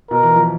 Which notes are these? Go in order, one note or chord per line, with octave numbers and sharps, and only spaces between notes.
B2 A#4
E3
F3